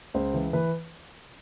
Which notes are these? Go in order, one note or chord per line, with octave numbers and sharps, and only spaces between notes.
C#2 C5
E3
E3 B4